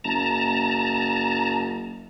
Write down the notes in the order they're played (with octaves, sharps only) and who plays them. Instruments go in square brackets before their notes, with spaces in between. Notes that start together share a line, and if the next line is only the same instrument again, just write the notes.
[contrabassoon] F#1 [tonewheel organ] A5 A#5